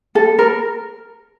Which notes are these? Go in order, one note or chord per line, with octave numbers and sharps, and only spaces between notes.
A4
A#4